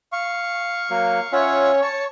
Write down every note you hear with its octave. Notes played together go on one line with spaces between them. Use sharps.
F5 C#6
F#3 A#3
C#4 F4 C#5 E5 F#5
A5 C#6